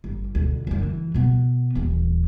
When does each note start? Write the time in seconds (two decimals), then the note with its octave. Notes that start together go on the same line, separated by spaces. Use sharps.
0.04 G1
0.35 D2 B2
0.67 F#2 D3
0.83 E3
1.14 B2 B3
1.75 D#1 E3